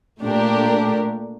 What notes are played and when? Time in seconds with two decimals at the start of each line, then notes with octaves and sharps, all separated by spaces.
0.21 A#2 A3 D4 G4 A#4